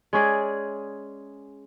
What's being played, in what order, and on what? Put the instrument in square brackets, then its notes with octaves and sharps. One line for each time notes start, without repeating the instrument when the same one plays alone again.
[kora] G#3 C#4 G#4 D5